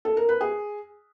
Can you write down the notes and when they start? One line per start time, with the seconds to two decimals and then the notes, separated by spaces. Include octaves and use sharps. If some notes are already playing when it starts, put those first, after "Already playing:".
0.05 A4
0.17 A#4
0.29 B4
0.41 G#4